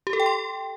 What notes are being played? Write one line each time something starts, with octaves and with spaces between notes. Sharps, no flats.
G4
A4
G5
C6